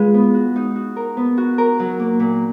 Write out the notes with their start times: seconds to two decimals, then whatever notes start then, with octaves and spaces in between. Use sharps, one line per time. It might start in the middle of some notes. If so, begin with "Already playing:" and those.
Already playing: G#3 F4 B4
0.14 B3
0.34 F#4
0.56 D#4
0.76 F#4
0.96 A#4
1.17 B3
1.38 F#4
1.58 A#4
1.79 F#3
2.00 A#3
2.20 A#2